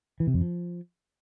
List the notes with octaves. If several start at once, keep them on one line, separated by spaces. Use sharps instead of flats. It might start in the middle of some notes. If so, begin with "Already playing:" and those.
E3
C3
F2
F3